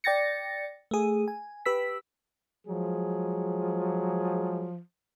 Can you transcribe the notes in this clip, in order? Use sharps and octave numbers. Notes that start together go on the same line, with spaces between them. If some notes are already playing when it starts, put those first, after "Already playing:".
D5 G5 A6 A#6 C#7
A3 G#4
G#5
G4 B4 E6 B6
F3 F#3 G#3 G#4